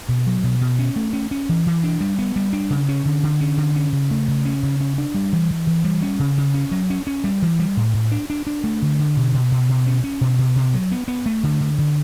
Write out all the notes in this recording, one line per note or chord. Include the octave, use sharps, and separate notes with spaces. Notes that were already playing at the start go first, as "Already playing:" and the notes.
B2
F#3
B2
B2
C#4
A3
C#4
C#4
E3
E3
D4
G3
B3
G3
D4
C#3
C#4
D3
D3
C#4
D3
C#4
C#3
A3
C#3
C#4
C#3
C#4
D4
G3
E3
E3
E3
G3
C#4
C#3
C#3
C#4
F#3
C#4
C#4
G3
E3
G3
A2
A2
D4
D4
D4
A3
D3
D3
B2
B2
B2
B2
C#4
C#4
B2
B2
B2
F#3
B3
B3
A3
D3
D3
D3